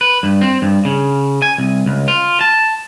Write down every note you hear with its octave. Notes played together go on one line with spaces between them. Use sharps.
B4
G2
C4
G2
C#3
G#5
C2
C#2
F4
A5